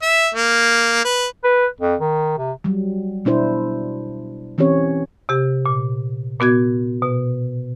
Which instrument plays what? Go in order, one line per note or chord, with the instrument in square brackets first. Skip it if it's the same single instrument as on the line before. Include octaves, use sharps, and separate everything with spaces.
[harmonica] E5
A#3
B4
[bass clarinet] B4
F2
D#3
C3
[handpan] F#3 G3
B2 D4 E4 C5
E3 C4 C#4 G4 C#5
[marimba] C3 G4
A#2
A#2 B3 F#4 G#6
B2